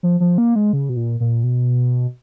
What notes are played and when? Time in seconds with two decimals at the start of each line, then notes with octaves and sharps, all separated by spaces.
0.03 F3
0.20 F3
0.38 A#3
0.56 G#3
0.73 C#3
0.89 B2
0.96 A#2
1.20 A#2
1.44 B2